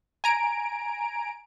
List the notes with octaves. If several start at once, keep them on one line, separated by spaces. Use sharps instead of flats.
G#5 A#5 D7